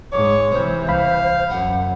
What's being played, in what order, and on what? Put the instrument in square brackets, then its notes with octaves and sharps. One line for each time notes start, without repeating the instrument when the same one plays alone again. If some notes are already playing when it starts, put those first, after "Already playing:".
[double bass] G#2 G#3 [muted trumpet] C#5 [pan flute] D6
[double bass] C3 E3 [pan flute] C5
[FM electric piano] C2 B5 [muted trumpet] F5
[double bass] F#2 [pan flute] F#5